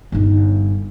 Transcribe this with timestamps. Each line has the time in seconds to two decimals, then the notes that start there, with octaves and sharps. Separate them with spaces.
0.12 G1 D#4